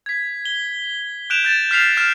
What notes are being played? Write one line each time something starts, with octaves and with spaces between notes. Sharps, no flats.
G#6 B6
G7
F#6 G6 D7 E7 F7
G6 A6 E7
F6 B6 C7 F7
F6 E7